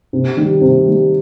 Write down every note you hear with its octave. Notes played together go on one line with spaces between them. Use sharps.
C3
D#3 G3
C3
D#3 G3